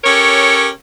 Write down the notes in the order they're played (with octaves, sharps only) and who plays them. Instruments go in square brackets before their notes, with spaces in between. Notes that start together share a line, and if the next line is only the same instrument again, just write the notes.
[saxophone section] C#4 G4 A4 A#4 C#5